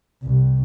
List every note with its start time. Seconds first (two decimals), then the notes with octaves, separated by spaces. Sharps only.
0.23 C2